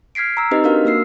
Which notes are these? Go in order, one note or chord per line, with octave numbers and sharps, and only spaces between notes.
F6 G#6 B6 C7 D7
A#5 E6
C4 D#4 G4 B4 D#5
D4 F#4 A#4 F5 F6
A#3 F#4 E6 C7